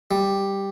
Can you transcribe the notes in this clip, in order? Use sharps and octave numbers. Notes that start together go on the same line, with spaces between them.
G3